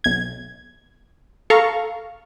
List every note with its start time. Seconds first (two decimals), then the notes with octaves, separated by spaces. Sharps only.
0.04 B1 G#6
1.50 A4 F5 A#5 C#6